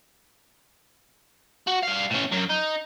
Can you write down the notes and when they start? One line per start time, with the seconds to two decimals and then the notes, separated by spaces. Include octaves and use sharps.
1.67 F#4
1.83 G3 F5
2.11 A2 C#4
2.32 F#2 F#3
2.50 D#4